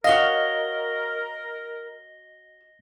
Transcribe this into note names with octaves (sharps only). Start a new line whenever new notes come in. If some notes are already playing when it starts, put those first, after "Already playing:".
F#4 A#4 C#5 D#5 F5 A#6 G7